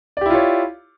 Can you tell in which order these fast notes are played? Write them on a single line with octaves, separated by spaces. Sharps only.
D5 G4 E4 F4 C#5